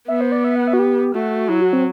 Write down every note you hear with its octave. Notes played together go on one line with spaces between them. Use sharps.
B3 E5
C5
D5
E5
F#5
E5
F#4
G4
A3 F#4
F#3 E4
F#4
C4